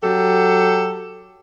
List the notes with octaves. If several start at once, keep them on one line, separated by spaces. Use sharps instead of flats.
F#3 G4 A4